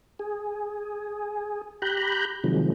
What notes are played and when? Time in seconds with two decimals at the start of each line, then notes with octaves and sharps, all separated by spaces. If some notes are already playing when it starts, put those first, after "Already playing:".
0.19 G#4
1.82 G4 A#5 B5 F#6 G6
2.44 C3 D#3 F3 F#3 G#3